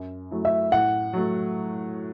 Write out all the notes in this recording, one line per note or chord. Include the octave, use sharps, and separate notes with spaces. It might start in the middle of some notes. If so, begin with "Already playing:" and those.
Already playing: F#2
F#3 A3 E4
E5
A2 F#5
F#3 A3